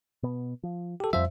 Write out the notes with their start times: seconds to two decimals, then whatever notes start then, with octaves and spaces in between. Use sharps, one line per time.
0.23 B2 B3
0.63 F3
1.00 G4 A4
1.13 F2 F3 G3 C5 E5